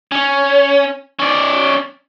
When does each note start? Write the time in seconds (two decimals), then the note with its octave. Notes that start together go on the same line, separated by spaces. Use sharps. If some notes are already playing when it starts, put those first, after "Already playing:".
0.12 C#4
1.19 C#4 D5